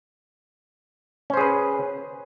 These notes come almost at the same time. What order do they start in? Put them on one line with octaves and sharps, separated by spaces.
C#4 C5 G#4 B4